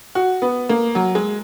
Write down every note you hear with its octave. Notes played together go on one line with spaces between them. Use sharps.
F#4
B3
A#3
F#3
G#3